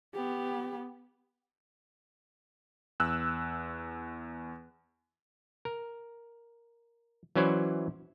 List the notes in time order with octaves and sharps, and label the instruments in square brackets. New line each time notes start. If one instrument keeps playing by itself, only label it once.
[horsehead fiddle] B3 G4
[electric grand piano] E2 E6 F#6
[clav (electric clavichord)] A#4
E3 F#3 C#4 E4 C5 D5